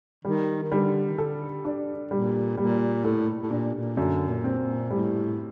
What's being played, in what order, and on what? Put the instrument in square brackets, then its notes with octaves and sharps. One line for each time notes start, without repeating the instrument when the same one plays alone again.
[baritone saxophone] D#3 [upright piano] G3
[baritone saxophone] D#3
[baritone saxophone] D3 [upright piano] G3
[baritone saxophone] D#3
[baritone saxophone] D3 [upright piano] A4
[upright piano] D4
[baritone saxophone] A#2 [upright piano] G3
[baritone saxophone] A#2 [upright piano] G3
[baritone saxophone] A2 [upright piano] A4
[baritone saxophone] A2
[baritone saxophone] A#2 [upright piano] D4
[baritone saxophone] A#2
[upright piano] F#2 [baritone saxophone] D3
[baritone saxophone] A#2
[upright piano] C4
[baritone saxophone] A#2
[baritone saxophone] A2 [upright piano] G3